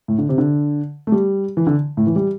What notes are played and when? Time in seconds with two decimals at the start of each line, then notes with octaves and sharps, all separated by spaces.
0.08 A2
0.18 D3
0.29 C3
0.38 D3
1.07 A3
1.12 G3
1.57 E3
1.67 D3
1.97 A2
2.07 E3
2.16 G3